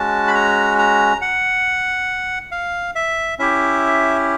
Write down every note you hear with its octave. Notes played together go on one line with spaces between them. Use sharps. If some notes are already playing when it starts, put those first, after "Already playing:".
Already playing: G#3 C#4 F#4 A5
B5
A#5
A#5
F#5
F5
E5
C#4 E4 G4 E5